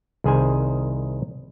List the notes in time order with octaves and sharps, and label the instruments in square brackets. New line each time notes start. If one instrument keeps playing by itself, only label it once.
[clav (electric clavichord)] C2 D#3 G#4 C5 G#5